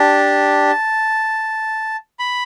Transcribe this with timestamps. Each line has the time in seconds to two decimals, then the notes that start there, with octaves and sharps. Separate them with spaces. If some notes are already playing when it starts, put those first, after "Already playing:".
Already playing: D4 G4 A5
2.19 B5